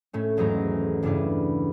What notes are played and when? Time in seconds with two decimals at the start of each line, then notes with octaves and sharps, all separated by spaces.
0.13 A2 A3 C#4
0.37 D#1 E2 G#2 F#3 A3 A#5
1.03 G2 C#3 G3 D4 E4 B4